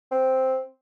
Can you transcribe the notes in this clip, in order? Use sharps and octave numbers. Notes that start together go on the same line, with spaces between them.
C4